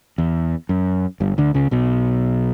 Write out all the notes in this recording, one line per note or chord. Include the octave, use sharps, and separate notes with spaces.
E2
F#2
G1 G2
D2 D3
C#2 C#3
B1 B2